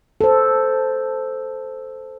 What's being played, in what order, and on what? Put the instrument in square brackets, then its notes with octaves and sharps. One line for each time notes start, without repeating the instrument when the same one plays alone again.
[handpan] A4 C5